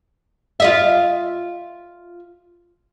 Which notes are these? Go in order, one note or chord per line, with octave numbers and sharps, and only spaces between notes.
F4 D#5 E5